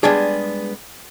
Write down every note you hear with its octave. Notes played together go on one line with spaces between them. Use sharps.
G3 G#3 B3 D4 G#4